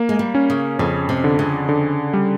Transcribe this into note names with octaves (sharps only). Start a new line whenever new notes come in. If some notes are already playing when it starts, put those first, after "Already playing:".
Already playing: A#3
G#3
G3
C#4
C#3
F2 C#3
C3
D3
C#3
D3
G3